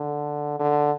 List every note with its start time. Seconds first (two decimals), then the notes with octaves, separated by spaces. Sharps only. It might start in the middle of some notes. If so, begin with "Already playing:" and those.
Already playing: D3
0.59 D3